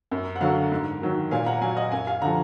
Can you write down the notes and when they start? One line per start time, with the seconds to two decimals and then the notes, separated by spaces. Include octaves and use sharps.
0.11 F#2
0.36 F#5
0.41 D3 F#3 F5
0.72 G#2
1.02 D#3 F#3
1.31 A#2 F5 G#5
1.46 F#5 A#5
1.62 F#3 F5 G#5
1.76 D#5 F#5
1.92 F#2 F5 G#5
2.07 F5 G#5
2.21 D3 F3 F#5 A#5